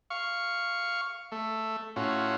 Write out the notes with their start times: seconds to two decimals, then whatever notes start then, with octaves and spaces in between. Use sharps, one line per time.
0.10 F5 C#6
1.32 A3
1.96 A2 C#4 F4 F#4